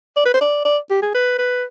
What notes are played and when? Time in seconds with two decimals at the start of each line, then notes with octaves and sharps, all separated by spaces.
0.17 D5
0.25 B4
0.34 C5
0.41 D5
0.65 D5
0.90 G4
1.02 G#4
1.14 B4
1.39 B4